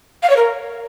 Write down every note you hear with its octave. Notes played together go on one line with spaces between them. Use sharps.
F5
C#5
A#4